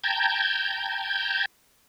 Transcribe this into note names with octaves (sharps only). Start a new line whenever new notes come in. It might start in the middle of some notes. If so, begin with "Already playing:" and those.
G5 A5 A#5 G6 G#6